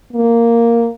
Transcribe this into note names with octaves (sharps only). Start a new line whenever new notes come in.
A#3